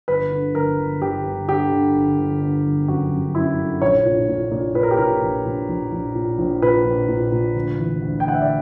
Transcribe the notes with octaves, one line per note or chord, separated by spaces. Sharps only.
G1 B4
D3
G1 A#4
G1
G1 G4
G1
D3 G4
D3
G1
G1
D3
G1
F#2 F#4
F#2
F#2 E4
D3
A#1 C#5
A#2
A#2
A#2
A#2 B4
A#4
G4
A#2 A#4
A#1
A#1
A#1
A#1
A#2
A#1
A#2 B4
A#1
A#2
A#2
D2
E3
D2
G5
D2 F#5
E5
D5